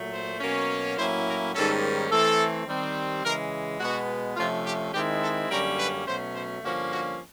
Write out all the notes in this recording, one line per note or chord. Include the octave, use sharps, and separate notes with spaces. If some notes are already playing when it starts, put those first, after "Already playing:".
Already playing: A#2 F#3 A3
C5
B2 F#3 A#3 C#4
A2 F#3 A#3 C#4 E4 C5
A#4
G#2 D#3 G3 A#3 C#4 A4
E3 A3 C4 A4
D#3 G3 C4
C#3 E3 G#3 A#4
B2 G#3 B3 F#4
C3 F3 A3 C#4 F4
G4
D#3 G#3 C4 E4 G4
A4
F#2 D3 G3 A#3 C#4 A#4
B4
B2 F#3 A3 C#4 C5
C5
G2 D3 F3 A#3 C#4 F#4
F#4